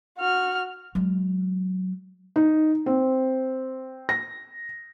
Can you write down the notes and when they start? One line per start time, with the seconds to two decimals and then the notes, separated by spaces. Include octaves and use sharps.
0.19 F#4 F6
0.95 F#3 G#3
2.36 D#4
2.86 C4
4.09 A#6